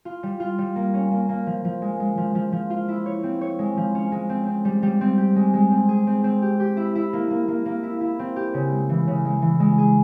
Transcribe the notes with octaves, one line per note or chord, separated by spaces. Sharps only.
F4
G3
F4
G3
A#3
C#4
A#3
A#3
F3
F3
G#3
G#3
F3
F3
F3
F4
E4
C#5
C4
C#5
G#3
F3
C#4
G#3
C4
C4
G3
G3
C4
G4
G#3
G#3
C4
G#4
C4
C4
G4
G4
E4
E4
A#3
A#3
A#3
A#3
E4
E4
C4
G4
C#3
G#3
E3
C#3
G#3
E3
G#3
G#4